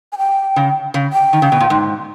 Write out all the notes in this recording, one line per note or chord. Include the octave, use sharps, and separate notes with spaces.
G#5
G5
C#3
C#3
G5
D#3
C#3
B2
A#2
G#2